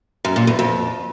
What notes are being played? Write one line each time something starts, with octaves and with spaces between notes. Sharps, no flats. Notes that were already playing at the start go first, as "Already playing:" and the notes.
F#2
A#2
E2
F2